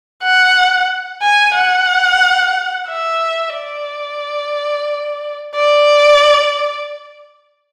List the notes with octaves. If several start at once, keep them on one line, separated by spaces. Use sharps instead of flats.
F#5
G#5
F#5
E5
D5
D5